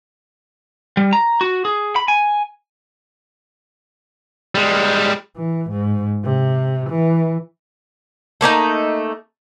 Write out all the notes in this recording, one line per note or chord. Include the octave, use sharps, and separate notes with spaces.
G3
A#5
F#4
G#4
B5
G#5
G3 G#3
E3
G#2
C3
E3
A3 A#3 C#4 D#4